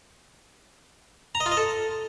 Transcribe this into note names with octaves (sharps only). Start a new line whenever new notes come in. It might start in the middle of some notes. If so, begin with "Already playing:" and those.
A#5
D#5
F4
D#5
A4